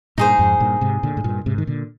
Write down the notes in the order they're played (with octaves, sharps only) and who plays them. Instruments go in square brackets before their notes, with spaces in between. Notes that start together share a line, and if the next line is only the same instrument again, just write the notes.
[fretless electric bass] G2 A#2 [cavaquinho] D#4 G#4 C5
[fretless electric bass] F2 G#2
G2 A#2
G#2 C3
A#2 D3
G#2
G2 A#2
G#2 C3
D#3
A#2 D3